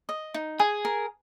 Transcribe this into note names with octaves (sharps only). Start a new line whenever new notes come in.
D#5
D#4
G#4 G#5
A#4